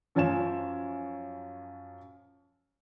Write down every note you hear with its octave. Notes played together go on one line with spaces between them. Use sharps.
F#2 F3 C#5 G#5 E7